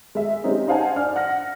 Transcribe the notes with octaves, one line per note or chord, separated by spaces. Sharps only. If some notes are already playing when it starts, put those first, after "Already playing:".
G#3 E5
G3 G#3 C4 C#4 D#4
D#4 C5 F5 F#5 G#5 A5
D4 D5 F6
F#5 F6 A#6